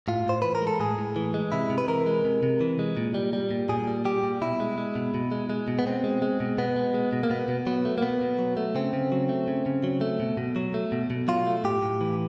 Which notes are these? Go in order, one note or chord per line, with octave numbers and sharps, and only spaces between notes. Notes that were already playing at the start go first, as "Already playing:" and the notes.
A2 F4
A2 C5
E3 B4
A#4
G#3
A4
A2 G#4
A2
E3
G#3
C3 E4
C3
B4
E3 A#4
G#3
C3
C3
E3
G#3
A#2
G3
G3
A#2
A#2 G#4
G3
G3 G4
A#2
B2 E4
G#3
G#3
B2
B2
G#3
G#3
B2
B3
B2 C4
G#3
G#3
B2
B2 B3
G#3
G#3
B2
A#3
B2 B3
B2
F#3 B3
A3
A#3
B2 B3
B2
F#3
A3
C#3 C4
C#3
F#3
A3
C#3
C#3
F#3
A3
B2
B2
F#3
A3
B2
B2
F#3 F4
A3
A2 G4
A2
E3